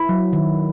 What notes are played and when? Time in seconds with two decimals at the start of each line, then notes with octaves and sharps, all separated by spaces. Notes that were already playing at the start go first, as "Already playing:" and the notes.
Already playing: E4
0.09 F#3
0.33 D#3